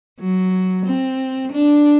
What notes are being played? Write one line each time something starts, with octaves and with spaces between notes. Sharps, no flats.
F#3
C4
D4